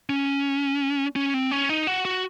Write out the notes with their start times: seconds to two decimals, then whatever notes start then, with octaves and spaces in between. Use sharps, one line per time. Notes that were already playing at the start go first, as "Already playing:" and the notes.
0.10 C#4
1.16 C#4
1.34 C4
1.51 C#4
1.69 D#4
1.87 F#4
2.05 F#4